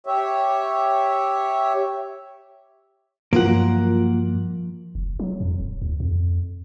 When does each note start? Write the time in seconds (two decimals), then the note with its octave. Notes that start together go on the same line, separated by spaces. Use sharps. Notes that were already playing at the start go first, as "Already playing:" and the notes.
0.07 G4 C#5 E5
3.33 G2 F3 F#3 A#3 F4 A#4 F#5
4.95 F1
5.20 F#3
5.40 F2
5.60 D#1
5.82 D2
6.00 F2